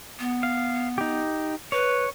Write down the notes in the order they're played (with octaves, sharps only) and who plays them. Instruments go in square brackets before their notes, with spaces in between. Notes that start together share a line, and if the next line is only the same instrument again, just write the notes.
[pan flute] B3
[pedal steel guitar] F5
D#4 G4
[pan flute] B4 [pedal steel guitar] C#5